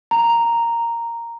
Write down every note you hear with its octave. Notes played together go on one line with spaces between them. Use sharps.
A#5